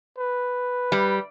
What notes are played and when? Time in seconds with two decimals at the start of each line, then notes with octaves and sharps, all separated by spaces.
0.19 B4
0.92 G3